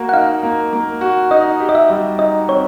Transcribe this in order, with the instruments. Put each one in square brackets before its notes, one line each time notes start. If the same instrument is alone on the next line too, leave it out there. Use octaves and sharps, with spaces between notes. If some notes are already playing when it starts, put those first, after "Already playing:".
Already playing: [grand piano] A#3 F#4
[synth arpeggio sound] F#5
[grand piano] D#4 [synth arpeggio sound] F5
[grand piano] A#3
A#3
F#4
[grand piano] D#4 [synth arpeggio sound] D#5
[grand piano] G4
[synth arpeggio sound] D#5
E5
[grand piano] G3
[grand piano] D#4 [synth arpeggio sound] D#5
[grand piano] C4 [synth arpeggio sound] C#5